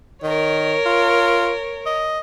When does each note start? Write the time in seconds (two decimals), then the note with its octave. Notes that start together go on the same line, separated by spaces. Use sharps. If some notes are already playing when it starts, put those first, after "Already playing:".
0.23 D#3 A#4 C#5
0.86 F4
1.86 D#5